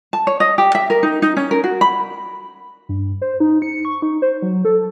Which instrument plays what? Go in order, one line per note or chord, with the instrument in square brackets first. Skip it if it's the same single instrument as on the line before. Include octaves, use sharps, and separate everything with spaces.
[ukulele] A5
C#5
D#5
G4
E5
A#4
D#4
D#4
C#4
A#4
F#4
B5
[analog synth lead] G2
C5
D#4
C#7
C#6
D#4
C5
F#3
A4